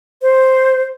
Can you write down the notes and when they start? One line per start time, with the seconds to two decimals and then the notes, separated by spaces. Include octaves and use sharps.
0.22 C5